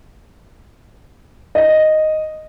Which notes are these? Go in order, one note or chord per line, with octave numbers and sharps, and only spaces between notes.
D#5